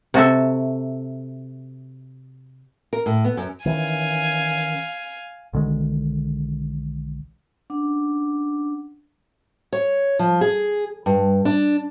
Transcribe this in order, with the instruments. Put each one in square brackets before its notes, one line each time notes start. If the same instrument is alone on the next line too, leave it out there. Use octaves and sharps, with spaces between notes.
[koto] C3 F#4 A4 E5
[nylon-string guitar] A#4
A2
B3
F#2
[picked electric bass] D#3 E3 C#4 [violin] F5 G#5
[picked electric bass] B1 D3 D#3 G#3
[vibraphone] C#4 D4 F#5 D6
[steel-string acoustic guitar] C#5
F3
G#4
G2
D4